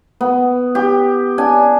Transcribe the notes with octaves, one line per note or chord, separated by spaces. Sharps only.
B3
G4
D4 G#5